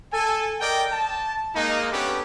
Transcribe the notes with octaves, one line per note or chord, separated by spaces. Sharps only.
A4 G#5
A#4 D5 D#5 G5
A5
G#3 A#3 D#4
B3 C#4 D4 G4 A4 B4